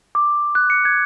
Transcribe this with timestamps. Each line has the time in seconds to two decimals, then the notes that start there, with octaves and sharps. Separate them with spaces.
0.15 D6
0.55 F#6
0.70 C#7
0.85 G#6